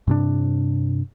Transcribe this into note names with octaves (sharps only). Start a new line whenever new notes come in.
G2 C3 D4